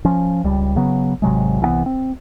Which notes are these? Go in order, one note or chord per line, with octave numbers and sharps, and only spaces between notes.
F3 C#4
C#2 G3
C#3 F#3 B3
G#1 C3 F#3 G#3
C2 E3 F3 B3
C4